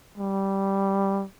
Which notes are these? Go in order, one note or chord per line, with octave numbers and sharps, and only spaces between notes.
G3